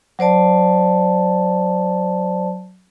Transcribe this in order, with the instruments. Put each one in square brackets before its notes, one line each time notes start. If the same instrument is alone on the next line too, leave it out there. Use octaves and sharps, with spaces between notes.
[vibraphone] F#3 C5 D5 A5